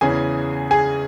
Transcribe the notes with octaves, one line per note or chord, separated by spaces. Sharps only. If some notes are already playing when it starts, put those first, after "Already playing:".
E2 C#3 E3 G#4 G#5
G#4 G#5